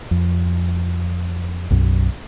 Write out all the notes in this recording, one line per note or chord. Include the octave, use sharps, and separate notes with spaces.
F2
B1 F#2